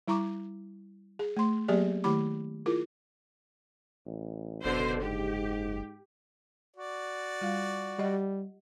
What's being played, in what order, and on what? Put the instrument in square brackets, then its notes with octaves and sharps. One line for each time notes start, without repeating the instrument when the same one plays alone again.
[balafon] G3 E4 A#5 C#6 D6
G#4
A3 C6
F#3 A#3 B3 G4 G#4 D5
D#3 A3 E4 G4 B5 D6
E4 F4 G#4 A#4
[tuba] A1
[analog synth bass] F#1 [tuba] B2 [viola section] D3 C5
[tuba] G#2 [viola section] G4
[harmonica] F#4 D5
[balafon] G3 F4 F5
[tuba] G3 [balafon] G4 D#5 F#5